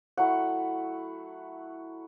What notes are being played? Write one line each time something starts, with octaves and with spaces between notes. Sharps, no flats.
F#3 A3 E4 F#5